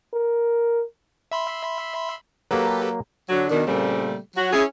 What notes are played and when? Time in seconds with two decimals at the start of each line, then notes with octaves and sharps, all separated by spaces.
0.13 A#4
1.32 E5 B5 C6
2.51 F#3 A#3 G4 A4 B4
3.30 D3 F#3
3.50 B2 D#3 D4
3.67 A#2 C#3 G3 A3 A#3 C4
4.37 F#3 F#4
4.53 C#4 E4 G#4